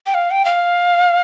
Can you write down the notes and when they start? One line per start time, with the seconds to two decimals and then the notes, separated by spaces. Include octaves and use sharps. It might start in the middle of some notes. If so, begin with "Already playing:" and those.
0.06 G5
0.14 F5
0.31 G5
0.45 F5